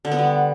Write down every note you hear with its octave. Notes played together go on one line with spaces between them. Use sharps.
D3
B3
G3